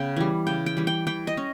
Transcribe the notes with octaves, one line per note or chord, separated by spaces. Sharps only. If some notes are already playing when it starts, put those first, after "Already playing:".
Already playing: C#3 B3 G5
E3 G3
C#3 G5
G5
E3 G3
G5
E3 G5
D#5
C#4